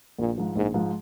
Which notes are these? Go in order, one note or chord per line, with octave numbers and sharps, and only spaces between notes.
A#1 A#2
G#2 F3
A#1 G#2
G#2 F3